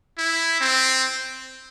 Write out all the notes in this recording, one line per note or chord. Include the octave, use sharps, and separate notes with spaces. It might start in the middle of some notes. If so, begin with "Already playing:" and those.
E4
C4